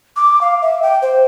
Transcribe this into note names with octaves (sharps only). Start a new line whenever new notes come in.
D6
F5
E5
G5
C5